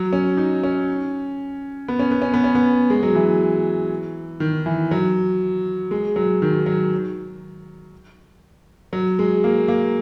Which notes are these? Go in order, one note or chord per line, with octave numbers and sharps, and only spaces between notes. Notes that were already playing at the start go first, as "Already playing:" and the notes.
Already playing: F#3
C#4
D#4
C#4
B3
C#4
B3
C#4
B3
C#4
B3
G#3
F#3
E3
D#3
E3
F#3
G#3
F#3
D#3
F#3
F#3
G#3
A#3
A#3